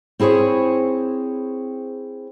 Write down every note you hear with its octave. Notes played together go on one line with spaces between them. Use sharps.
C4 E4 G#4 C5 C#5